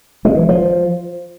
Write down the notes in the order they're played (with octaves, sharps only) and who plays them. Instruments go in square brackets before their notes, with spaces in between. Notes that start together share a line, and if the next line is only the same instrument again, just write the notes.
[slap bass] G#3
E3
F3